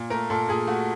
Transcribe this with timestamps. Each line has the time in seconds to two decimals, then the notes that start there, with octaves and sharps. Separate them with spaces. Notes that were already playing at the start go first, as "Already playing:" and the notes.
Already playing: A#2
0.10 A3 A#4
0.30 A#2 A4
0.48 A#2 G#4
0.67 A3 F#4